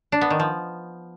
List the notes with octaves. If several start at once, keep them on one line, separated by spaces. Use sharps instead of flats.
D4
B3
D#3
F3